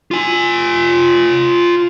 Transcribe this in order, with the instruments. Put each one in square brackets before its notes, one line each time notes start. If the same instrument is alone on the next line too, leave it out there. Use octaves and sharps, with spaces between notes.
[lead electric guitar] F4 G#5